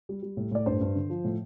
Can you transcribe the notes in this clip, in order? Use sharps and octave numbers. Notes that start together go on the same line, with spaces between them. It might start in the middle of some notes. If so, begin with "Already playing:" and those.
G3
G3
A2
A2 D5
G2 C5
G2
D3
F3
A2